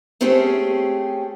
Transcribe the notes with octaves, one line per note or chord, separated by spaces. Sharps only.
A3 C4 C#4 G4 G#4